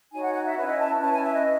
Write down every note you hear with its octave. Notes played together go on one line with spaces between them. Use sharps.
D#4 F#4 C#5 G#5
F#5
F#5
E5
C#4 E4 B4 C#5
D#5
A5
C#4 E4 B4 A5
G#5
E5
D#5